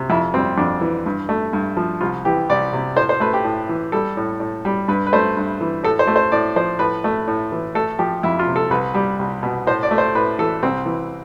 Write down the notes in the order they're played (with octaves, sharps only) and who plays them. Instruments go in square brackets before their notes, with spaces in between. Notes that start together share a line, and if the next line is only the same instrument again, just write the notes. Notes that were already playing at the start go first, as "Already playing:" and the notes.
Already playing: [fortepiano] C3
F2 E4
G3 C4
F2 D4
E3
G2
A3
G2
F3
C2 F4
E3 G4
C2 D5
C3
A2 C5
C5
A3 B4
G4
A2
E3
G3 A4
A2
A2
G3
G2 B4
B4
A3 C5
G2
E3
A2 A4
C5
A3
C5
A2 D5
F3 C5
A2 B4
A3
A2
E3
A3 A4
F3 G4
F2 E4
F4
C3
A4
C2 B4
G3
C2
B2
A2 C5
D5
A3
C5
A2 B4
E3 A4
C2 C4
E3